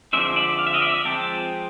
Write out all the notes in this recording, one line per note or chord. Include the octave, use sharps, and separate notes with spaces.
D3 F3 G#3 C4 D#4 D5 E5
D5 E5
F5
E5
D#5 F5
D5 E5
F3 G#3 C4 G5 A5